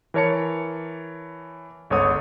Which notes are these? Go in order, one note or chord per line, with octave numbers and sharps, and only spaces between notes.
E3 A#4 C#5 A5 C#7
G1 C#2 A4 C#5 F#5 D#6